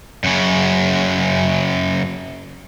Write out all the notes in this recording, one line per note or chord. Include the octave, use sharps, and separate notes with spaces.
F#2 C#3